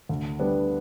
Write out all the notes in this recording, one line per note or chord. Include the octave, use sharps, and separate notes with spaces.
D2
D3 G3 B3 D4